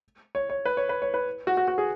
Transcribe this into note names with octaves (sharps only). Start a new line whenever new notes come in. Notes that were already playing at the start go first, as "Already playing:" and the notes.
C#5
C#5
B4
C#5
B4
C#5
B4
F#4
F#4
F#4
G#4